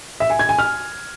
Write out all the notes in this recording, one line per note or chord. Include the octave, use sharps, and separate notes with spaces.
E5
G#5
G#6
G#5
F6